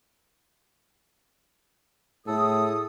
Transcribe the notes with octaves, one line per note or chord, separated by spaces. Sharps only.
A2 G#4 A4 D#6